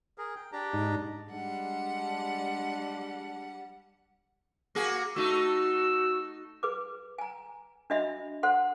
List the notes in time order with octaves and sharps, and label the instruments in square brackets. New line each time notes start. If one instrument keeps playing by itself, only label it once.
[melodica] G#4 A#4
G5
D4 G4 A#5
[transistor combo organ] G#2 D#4
[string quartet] G3 F#5 [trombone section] G#3 D4
[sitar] A#3 F#4 G#4
[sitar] A3 D#4 [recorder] F#4 [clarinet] E6
[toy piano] G#4 B4 D6
G#5 A#5
D4 F#4 D#5 E5 B5
A4 C5 F#5 C6